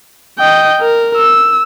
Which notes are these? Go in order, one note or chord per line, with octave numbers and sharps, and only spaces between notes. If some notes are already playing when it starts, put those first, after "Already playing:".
D#5 G5
A#4
E6